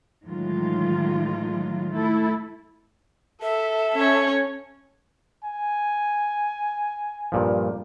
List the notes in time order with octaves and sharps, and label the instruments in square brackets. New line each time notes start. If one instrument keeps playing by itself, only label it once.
[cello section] A2 D#3 E3 F#3 G#3 F4
A3 E4 A4
[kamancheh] A4 [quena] E5
[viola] C#4 C#5
[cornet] G#5
[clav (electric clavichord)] G2 A#2 F3